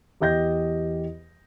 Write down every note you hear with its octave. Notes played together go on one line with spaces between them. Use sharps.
E2 G4 D#5 G6 A#6